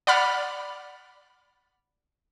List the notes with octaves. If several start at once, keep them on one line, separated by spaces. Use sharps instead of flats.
D5 F#5 B5 F6